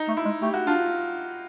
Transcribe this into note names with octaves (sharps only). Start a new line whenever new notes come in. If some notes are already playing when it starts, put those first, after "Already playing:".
Already playing: D#4
A3
E4
G#3
A3 G4
F#4
D4 F4